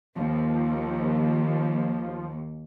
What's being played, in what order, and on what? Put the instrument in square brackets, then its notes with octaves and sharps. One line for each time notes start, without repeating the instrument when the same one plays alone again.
[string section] D#2 [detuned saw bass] F3